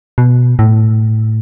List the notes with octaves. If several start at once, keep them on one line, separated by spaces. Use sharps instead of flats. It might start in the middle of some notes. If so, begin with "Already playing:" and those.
B2
A2